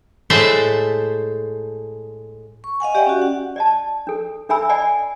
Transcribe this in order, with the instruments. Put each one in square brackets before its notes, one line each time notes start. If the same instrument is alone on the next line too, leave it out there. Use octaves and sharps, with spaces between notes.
[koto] A2 G#3 A3 C5 E5 F#5
[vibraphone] C#6
D#5 F5 F#5 G#5
G4 D5 E5 F#5 G5
C#4 F#4
F#5
[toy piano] D5 D#5 A5
D4 A4
D4 A4 E5 G#5 B5 E6
D5 D#5 F#5 G#5 B5